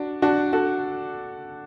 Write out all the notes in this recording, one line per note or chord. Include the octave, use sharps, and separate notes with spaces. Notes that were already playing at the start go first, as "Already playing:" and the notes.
Already playing: D4 F#4
D4 F#4
F#4 A4